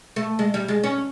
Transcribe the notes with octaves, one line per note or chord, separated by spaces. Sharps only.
A3
G#3
G3
G#3
C#4